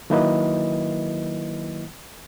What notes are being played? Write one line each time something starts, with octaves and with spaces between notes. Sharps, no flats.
D#3 F#3 A#3 E4 B4 D#5